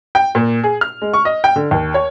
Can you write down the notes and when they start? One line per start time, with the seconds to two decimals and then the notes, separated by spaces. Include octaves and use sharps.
0.15 G5
0.35 A#2
0.64 G#4
0.81 F6
1.02 G#3
1.14 C#6
1.25 D#5
1.44 G5
1.56 D3
1.71 D#2
1.94 C#5